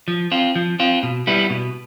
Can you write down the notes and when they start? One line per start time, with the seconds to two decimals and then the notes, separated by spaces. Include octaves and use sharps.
0.08 F3
0.32 C4 F4
0.55 F3
0.80 C4 F4
1.03 B2
1.27 G3 B3 E4
1.50 B2